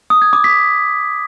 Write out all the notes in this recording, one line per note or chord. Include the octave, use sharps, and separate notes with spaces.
D#6
G#6
D6
B6